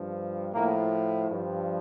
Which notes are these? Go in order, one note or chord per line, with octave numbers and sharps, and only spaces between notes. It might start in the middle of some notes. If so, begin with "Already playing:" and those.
Already playing: G2 F3
A2 F3 A#3
G2 F3